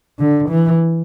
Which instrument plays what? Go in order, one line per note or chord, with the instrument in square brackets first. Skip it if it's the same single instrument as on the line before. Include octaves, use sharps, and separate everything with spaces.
[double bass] D3
E3